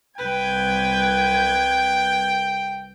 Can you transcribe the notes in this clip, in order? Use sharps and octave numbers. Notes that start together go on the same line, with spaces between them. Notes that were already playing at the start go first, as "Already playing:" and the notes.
C2 B4 G5 G#6